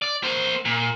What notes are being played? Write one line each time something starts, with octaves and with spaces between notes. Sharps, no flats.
D5
A#3 C5
A#2